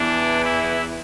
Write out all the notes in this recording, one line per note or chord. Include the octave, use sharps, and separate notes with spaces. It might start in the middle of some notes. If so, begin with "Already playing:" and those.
Already playing: E2 E3 D4
E4